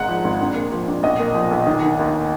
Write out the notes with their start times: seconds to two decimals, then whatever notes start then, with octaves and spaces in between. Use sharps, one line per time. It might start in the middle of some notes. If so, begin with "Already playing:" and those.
Already playing: G#1 G#2 F#5
0.08 F3
0.24 G#1
0.41 A#1
0.55 A#2
0.72 F3
0.87 A#1
1.03 B1 D#5
1.19 A#2
1.34 F3
1.51 B1
1.67 D#3
1.83 D#3
1.99 D#2